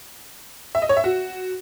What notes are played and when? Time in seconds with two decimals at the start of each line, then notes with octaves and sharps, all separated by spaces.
0.75 E5
0.82 D#5
0.89 C#5
0.97 E5
1.04 F#4